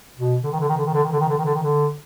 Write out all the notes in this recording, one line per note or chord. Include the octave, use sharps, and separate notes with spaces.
B2
D3
D#3
D3
D#3
D3
D#3
D3
D#3
D3
D#3
D3
D#3
D3
D#3
D3